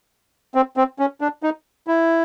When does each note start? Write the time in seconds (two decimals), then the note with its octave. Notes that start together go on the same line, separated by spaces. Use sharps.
0.55 C4
0.77 C4
0.99 C#4
1.21 D4
1.43 D#4
1.87 E4